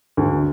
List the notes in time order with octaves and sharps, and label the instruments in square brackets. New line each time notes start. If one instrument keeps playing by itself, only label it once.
[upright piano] D2